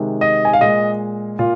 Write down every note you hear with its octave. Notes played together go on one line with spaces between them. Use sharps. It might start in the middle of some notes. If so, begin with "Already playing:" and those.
Already playing: C3 D#3 G#3
D#5
G#5
F5
A#2 G#3 D#5
A#2 F4